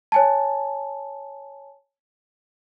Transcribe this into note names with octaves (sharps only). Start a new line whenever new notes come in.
C#5 G#5 A5